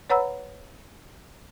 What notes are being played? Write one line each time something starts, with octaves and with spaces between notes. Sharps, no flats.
B4 C#5 F#5 A#5 B5 E6